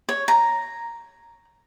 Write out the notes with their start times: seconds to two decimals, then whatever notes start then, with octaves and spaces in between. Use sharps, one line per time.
0.09 C#5
0.28 A#5